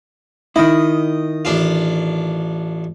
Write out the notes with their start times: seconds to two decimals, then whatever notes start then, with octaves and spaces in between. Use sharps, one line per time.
0.56 D#3 E4 D#5
1.45 A1 D4 F4